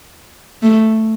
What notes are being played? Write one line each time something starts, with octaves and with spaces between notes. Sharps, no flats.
A3